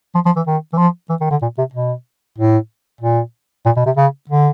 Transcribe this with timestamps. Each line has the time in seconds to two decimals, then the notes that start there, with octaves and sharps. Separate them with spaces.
0.15 F3
0.25 F3
0.36 E3
0.47 D#3
0.73 E3
0.78 F3
1.10 E3
1.21 D#3
1.31 D3
1.42 A#2
1.58 C3
1.74 B2
2.38 A2
3.01 A#2
3.66 A#2
3.76 B2
3.86 C3
3.97 C#3
4.30 D3